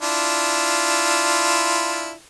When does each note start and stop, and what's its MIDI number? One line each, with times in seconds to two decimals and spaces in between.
0.02 2.11 62
0.02 2.11 64
0.02 2.11 65